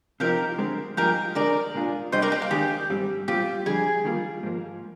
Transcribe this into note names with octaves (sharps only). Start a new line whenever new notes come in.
C3 F3 C4 D#4 G4 A#4
D3 G#3 C4
G2 F3 A#3 D#4 G4 G#4 A#4
D3 G#3 D4 G#4 A#4 D5
A#2 G#3 D4 F4 G#4
C3 G3 D4 G4 C5 D#5
A#4 D5
G4
F4
D#3 G#3 D4 G4 G#4
G#2 G3 C4
A#2 G3 C4 F4 G4
F2 D3 G3 G#4
D#3 G3 A#3 F4
G#2 F3 A#3